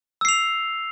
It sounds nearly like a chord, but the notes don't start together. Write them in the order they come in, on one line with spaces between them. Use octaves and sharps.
E6 C7 F7